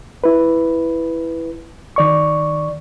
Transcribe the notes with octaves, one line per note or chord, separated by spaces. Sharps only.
E4 B4
D#3 D5 C#6